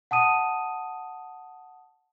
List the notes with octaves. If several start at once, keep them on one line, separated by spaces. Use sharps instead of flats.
F#5 A5 D#6 D#7